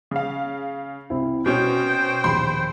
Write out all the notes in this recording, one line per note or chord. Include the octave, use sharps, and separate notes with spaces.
C#3 F5
C2 C4 E4
B2 C#4 F#4 C5 G5
A#1 D#2 B5 C6